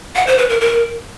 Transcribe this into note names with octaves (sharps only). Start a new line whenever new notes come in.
F#5
C5
B4
A#4
A#4